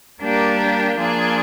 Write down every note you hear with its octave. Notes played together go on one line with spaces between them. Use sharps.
G3 A#3 D4 G4 A#4
F3 A#3 D4 F4 G#4